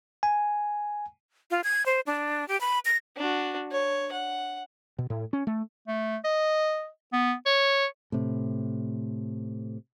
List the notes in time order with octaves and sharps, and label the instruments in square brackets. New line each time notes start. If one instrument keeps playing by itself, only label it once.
[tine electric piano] G#5
[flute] F4
G#6
C5
D4
G4
B5
A#6
[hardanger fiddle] D4 F#4
C#5
F#5
[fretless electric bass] B2
A2
C#4
A3
[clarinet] A3
D#5
B3
C#5
[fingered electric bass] A2 C3